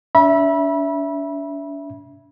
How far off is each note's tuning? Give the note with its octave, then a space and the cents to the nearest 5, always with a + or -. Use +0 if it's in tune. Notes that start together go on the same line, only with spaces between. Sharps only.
D4 -40 E5 +0 B5 -30